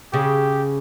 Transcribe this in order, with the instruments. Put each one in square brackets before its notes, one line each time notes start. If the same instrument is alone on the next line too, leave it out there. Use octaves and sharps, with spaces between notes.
[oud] C#3 [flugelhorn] G4